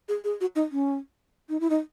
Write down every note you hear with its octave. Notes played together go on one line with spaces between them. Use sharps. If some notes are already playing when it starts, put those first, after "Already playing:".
G#4
G#4
F#4
D#4
C#4
D#4
E4
D#4